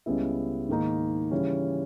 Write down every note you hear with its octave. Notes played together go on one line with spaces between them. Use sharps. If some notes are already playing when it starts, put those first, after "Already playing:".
C#2 C#3 G3 B3 E4
G#2 D#3 A#3 D#4
C#3 E3 G3 C#4